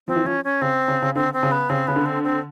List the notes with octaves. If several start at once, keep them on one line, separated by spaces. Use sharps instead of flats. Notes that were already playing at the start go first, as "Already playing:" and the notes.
F3 C4
E3
F3 C#4
C#4
C#3 C4
C#3
C#3
D3 C4
C4
C#3
B3
C#3 C4
C#3 B3
D3
C4
C4